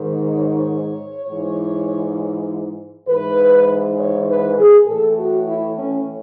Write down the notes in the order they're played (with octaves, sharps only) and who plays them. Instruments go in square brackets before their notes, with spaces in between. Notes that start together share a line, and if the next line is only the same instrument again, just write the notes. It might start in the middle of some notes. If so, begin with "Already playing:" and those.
Already playing: [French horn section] G#2 D#3
C#5
G#2 E3
G#2 E3 B4
C#5
B4
G#4
A2 E3 A4
F#4
E4
C#4